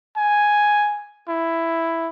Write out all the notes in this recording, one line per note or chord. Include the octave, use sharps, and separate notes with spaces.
G#5
E4